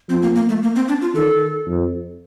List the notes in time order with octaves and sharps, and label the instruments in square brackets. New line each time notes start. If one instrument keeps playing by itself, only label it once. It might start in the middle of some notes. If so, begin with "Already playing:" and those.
[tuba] F3 [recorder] C4
[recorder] A#3
A#3
A3
A#3
C4
D4
F4
[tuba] D#3 [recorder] A4
[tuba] F2